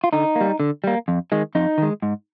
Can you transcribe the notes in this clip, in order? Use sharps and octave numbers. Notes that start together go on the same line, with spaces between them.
F4
D3 D#4
A#3
G3
D3
G3 A#3
F2
D#3 G#3
F2 D#4
D#3 G#3
G#2